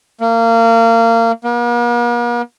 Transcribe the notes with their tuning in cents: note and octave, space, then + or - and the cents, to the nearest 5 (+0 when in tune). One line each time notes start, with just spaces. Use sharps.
A#3 -25
A#3 +45